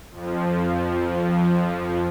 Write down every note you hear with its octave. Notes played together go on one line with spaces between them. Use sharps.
F2 F3